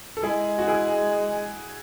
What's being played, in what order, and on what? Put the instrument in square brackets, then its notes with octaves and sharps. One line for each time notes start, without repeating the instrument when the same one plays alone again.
[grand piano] A4
[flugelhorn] G#3 [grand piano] E4 G#4
[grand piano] F#4
E4 G#4